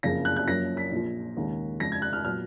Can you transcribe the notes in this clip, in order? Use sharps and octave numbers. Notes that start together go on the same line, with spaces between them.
F#1 F2 C#3 A#6
F#6
F#6
F#2 F3 A#3 C#4 A#6
B6
A#1 A#2 F3
D#2 C#3 G#3 C#4
F2 C#3 G#3 A#6
G#6
F#6
F6
A#2 F#3 B3 F6